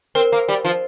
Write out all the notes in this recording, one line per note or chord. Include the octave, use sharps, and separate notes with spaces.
C4 A#4
A#3
G3
F3